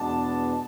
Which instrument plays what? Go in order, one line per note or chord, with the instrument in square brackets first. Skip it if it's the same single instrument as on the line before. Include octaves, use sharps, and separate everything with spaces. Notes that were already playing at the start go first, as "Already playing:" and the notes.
Already playing: [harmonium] E2 B2 G#3 B3 D4 [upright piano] A5